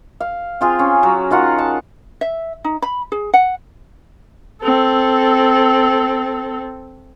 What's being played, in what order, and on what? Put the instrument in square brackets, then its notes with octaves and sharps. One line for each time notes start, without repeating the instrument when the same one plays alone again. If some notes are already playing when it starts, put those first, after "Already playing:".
[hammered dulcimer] F5
C4 F4 G#4
C#4
F#3
D#3 F4 F#5 A#5
A5
[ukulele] E5
D#4
B5
G#4
F#5
[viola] C4 A4